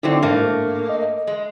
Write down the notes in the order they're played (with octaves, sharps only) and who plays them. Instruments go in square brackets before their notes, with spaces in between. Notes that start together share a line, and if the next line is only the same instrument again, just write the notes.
[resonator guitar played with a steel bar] D3 F#3 C4 [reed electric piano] D#4 E4 D5
[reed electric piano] G#2 D4 [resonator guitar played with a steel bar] A3 A#3
[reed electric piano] D#5
[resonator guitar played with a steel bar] G#3